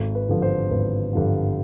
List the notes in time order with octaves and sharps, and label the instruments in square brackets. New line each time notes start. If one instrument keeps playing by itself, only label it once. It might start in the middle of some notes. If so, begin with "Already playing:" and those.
Already playing: [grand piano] G#1 A4
B4
G2 D3 F3
C5
G#1 B4
G2 D3 F3